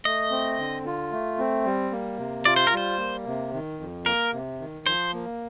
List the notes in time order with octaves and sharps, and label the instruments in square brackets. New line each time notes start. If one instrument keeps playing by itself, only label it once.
[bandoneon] A3 [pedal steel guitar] D#5
[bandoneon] C4
D3
F4
A3
C4
G3
A#3
C3
[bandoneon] F4 [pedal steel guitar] D5
[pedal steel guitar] C5
A#4
[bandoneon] G3 [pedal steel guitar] C5
[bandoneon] A#3
C3
D#3
F2
[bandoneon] A#3 [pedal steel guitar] A#4
[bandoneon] C3
D#3
[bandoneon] F3 [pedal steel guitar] C5
[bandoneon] A#3